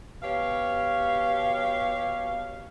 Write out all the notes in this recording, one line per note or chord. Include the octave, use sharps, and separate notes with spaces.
B2 G4 C#5 F5